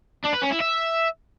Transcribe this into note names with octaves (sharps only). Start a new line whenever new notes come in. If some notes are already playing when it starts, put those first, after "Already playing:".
D4
B4
C#4
E4
E5